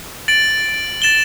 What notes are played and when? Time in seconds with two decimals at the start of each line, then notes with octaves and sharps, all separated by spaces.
0.28 A6 D7 F#7
1.02 A6 E7 G7